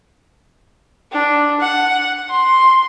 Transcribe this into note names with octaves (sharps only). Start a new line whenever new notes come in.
D4
F#5
C6